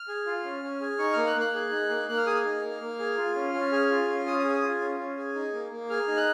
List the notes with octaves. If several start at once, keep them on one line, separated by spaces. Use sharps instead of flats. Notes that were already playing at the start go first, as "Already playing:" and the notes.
Already playing: F6
G#4
F4
C#4
C#4
G#4
D#4 C#6
A#3 F6
F#6
A#3
F#6
G#4
D#4
A#3
A#3 F#6
F6
G#4 D#6
F6
D#4
A#3
A#3
G#4
F4
C#4
C#4
G#4
F4
C#4
C#4 D#6
G#4 D#6
D#6
F4
C#4
C#4
G#4
D#4
A#3
A#3
G#4 F6
D#4
F#6